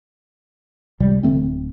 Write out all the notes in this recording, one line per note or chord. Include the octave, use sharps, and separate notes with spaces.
C#2 C3 G3
D1 D3 A3 C4